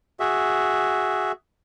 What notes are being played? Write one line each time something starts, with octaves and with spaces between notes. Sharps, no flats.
F#4 G#4 E5